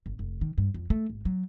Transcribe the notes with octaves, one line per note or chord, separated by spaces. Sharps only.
G1
F1
D#3
G2
F2
A3
G#1
F#3